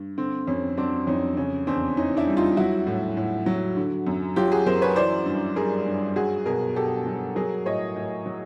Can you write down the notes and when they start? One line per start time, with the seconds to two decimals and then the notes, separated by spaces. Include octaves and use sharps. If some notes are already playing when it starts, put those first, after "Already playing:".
Already playing: G2
0.18 D3 C4
0.48 F2 C#4
0.77 F#3 C4 D4
1.07 F2 C#4 D#4
1.37 C#3 C#4
1.67 E2 C4 D4
1.97 E3 C#4 D#4
2.17 D4 E4
2.27 G3
2.37 D#4 F4
2.57 F#3 E4 F#4
2.87 A2
3.17 A2
3.46 F#3
3.76 D3
4.07 F#2
4.36 F#3 F4 G4
4.52 F#4 G#4
4.66 F#2 A#4 C5
4.82 B4 C#5
4.96 E3 C5 D5
5.26 G2
5.56 G3 G#4 A#4
5.86 G2
6.16 F#3 F#4 G#4
6.46 B2 G#4 A#4
6.76 B2 G4 A4
7.06 F#3
7.36 F#3 G#4 A#4
7.66 A2 C#5 D#5
7.96 A2
8.26 F#3